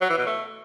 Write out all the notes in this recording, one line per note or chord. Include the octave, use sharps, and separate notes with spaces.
F#3
E3
B2
A3